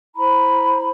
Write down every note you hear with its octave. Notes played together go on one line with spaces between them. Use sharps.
E4 C5 A#5 B5